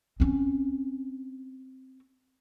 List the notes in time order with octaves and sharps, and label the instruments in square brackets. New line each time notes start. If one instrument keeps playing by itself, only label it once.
[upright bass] C4 C#4